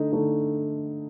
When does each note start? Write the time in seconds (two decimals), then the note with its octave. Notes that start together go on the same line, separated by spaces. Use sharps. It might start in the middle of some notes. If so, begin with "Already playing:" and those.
Already playing: D3 A3 D#4
0.12 D3 A3 D#4